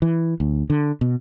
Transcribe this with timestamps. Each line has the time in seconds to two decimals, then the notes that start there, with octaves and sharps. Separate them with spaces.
0.02 E3
0.40 D2
0.70 D3
1.01 B2